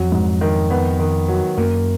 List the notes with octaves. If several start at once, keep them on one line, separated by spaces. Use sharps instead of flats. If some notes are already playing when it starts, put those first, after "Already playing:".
Already playing: F2 F#3
G#2
D#3
B3
D#3
F#3
F#2 A#3